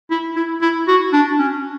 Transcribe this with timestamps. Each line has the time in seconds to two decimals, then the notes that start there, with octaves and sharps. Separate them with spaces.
0.11 E4
0.36 E4
0.62 E4
0.88 F#4
1.13 D4
1.39 C#4